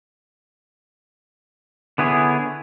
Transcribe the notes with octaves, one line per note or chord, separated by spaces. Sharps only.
D3 B3 E4 G#4 C#5